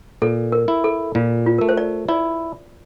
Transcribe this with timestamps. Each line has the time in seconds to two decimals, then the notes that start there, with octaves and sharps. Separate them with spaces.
0.22 A#2 A4
0.52 A#4
0.68 E4
0.84 A4
1.15 A#2 F4
1.46 F4
1.58 A3 A#4
1.69 C5
1.77 D5
2.09 E4 D5